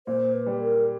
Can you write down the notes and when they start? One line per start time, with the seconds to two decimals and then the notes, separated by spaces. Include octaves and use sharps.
0.07 A#2 C5
0.34 B4
0.46 G3
0.60 A#4